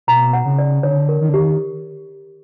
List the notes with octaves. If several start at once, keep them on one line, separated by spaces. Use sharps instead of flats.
B2 A#5
F#5
C#3
D5
D3 C#5
A#4
D#3
D3
D#3 G4